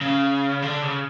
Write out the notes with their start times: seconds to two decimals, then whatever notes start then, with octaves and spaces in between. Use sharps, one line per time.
0.01 C#3
0.62 D3
0.82 C#3